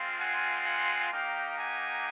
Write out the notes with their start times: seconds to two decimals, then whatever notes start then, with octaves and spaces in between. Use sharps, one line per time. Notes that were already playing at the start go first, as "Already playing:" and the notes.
Already playing: G#3 C4 F4
0.19 F#5 G#5
0.65 F#5 G#5
1.11 A#3 D#4 G4 F5 G5
1.58 F#5 G#5